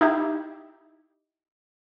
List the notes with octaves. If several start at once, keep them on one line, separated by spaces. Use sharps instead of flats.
D#4 E4 G4